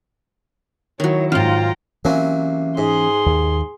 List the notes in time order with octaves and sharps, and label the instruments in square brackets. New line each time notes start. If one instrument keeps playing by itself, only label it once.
[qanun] D#3 F#3 [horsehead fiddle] E4 C#5
[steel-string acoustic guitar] F2 G#2 [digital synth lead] F4 [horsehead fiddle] G5 A#5
[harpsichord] C3 F#3 A#3 [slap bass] E3 C#4
[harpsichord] G#2 [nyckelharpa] G#4 C6
[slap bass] D#2